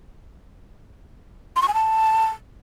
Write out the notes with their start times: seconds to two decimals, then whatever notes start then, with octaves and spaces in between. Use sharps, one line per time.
1.56 C6
1.62 C#6
1.68 G#5
1.74 A5